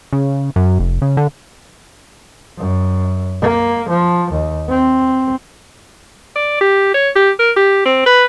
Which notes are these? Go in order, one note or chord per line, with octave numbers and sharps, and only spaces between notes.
C#3
F#2
F1
C#3
D3
F#2
A#3
F3
D#2
C4
D5
G4
C#5
G4
A#4
G4
C4
B4